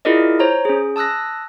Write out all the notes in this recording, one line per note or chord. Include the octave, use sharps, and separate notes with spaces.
E4 F4 G#4 A#4 D5 D#5
C5 C#5 A#5
C#4 G#4
A5 D#6 E6 F#6 A#6